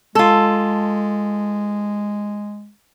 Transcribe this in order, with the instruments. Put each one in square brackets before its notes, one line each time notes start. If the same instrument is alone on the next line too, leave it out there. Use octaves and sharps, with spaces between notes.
[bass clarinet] G#3 [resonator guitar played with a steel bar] F4 A4